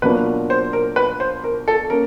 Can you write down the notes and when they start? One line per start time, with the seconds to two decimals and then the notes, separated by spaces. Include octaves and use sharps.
0.02 B2 F#3 A#3 D4 F4 B4
0.50 C5
0.73 A#4
0.96 B4
1.20 C5
1.44 A#4
1.68 A4
1.90 A#3 C#4 A#4